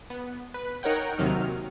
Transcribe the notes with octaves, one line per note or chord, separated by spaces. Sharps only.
B3
B4
D#4 A#4 C#5 F#5 G5
D#2 C3 D#3 F#3 D#4 F6